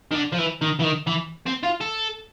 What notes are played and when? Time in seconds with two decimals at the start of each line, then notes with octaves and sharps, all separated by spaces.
0.12 D#3
0.15 D3
0.33 F3
0.38 E3
0.62 D#3
0.79 E3
0.84 D#3
1.07 E3
1.47 C4
1.64 F4
1.81 A4